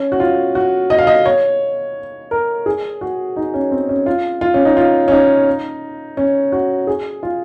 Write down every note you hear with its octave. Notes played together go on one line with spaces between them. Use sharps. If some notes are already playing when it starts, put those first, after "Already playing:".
Already playing: C#4
F#4
F4
F#4
D#5
F5
D#5
C#5
A#4
G#4
F#4
D#4
C#4
C4
C#4
F4
F4
C#4
D#4
F4
C#4
D#4
C#4
F#4
G#4
F4